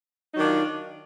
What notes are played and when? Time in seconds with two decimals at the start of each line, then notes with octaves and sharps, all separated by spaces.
0.32 D#4
0.35 F#3
0.37 D#3
0.40 D4
0.43 F4